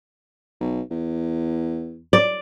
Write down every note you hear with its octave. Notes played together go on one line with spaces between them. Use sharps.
B1
E2
D5